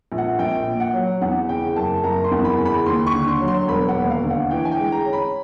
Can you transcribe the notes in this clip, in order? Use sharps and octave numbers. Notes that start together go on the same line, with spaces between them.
A#1
F#5
A#1 G5
A#2
F#5
F#3
E2 F#5
C#3 G5
F#1 A5
F#1 A#5
C6
E2
B5
C#3
B5
D#2 C6
C#6
D3
C6
F#3
C6
E1 B5
F#5
D#2
F5
D3
F#5
E3 G5
G#5
G5
G#3
A#5
C#4
B5